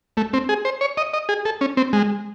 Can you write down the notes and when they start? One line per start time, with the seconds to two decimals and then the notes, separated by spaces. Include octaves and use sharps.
0.17 A3
0.33 C4
0.49 G#4
0.65 C5
0.81 C#5
0.97 D#5
1.13 D#5
1.29 G#4
1.45 A4
1.61 C#4
1.77 C4
1.93 G#3